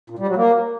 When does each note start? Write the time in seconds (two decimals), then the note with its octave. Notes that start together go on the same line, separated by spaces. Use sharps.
0.10 A#2
0.19 G3
0.27 F#3
0.36 A#3